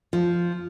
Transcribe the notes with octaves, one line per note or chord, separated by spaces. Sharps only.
F3